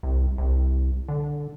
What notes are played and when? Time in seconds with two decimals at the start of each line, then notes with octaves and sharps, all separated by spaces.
0.03 C2
0.38 C2
1.08 D3